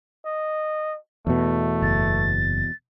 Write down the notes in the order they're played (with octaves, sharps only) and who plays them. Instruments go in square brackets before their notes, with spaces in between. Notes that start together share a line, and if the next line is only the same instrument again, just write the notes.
[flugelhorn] D#5
[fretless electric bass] E2 B2 [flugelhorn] A3
[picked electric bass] F#1 [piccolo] A6